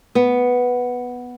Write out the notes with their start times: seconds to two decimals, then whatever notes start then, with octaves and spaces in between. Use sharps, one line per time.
0.15 B3